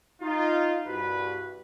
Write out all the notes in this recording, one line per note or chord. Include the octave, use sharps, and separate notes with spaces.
D#4 F4
C2 G2 F#4 B4